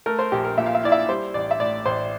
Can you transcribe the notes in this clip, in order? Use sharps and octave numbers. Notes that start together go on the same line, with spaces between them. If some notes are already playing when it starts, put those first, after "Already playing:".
A3 A#4
C5
A#1 G4
A#4
A#2 E5
F5
E5
E4 D5
E5
G3 C5
A1 D5
E5
A2 D5
A1 C5